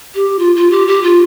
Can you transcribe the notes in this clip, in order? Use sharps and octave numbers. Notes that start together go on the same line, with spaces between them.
G4
F4
F4
G4
G4
F4